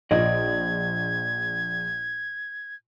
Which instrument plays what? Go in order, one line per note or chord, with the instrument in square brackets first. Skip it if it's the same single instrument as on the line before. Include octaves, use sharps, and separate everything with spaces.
[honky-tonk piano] A#1 [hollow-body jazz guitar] D5 D#5 [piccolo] G#6